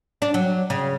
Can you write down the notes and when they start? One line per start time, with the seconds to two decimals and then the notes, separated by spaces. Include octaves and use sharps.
0.22 D4
0.34 F#3
0.70 C#3